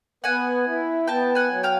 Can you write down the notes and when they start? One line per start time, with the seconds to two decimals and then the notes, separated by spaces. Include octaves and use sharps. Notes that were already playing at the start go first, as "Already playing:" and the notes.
0.24 B3 F#5 G#5
0.66 E4
1.07 B3 G5 A5
1.35 F#5 G#5
1.50 F#3
1.63 F5 G5